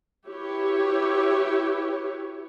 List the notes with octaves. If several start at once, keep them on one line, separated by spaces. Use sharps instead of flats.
E4 F#4 G4 B4 C#5